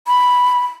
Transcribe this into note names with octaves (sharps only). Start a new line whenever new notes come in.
B5